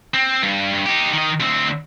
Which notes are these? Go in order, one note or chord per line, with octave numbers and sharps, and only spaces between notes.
C4
G2
G2
D#4 G4
D#3 D#5
D2 C4